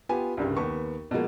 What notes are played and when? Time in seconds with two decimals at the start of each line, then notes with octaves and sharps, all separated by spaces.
0.09 B3 F4 G4 G#5
0.37 C2 G2 C#3
0.57 D#2 B3 C#6
1.11 B2 F3 G#3 A#3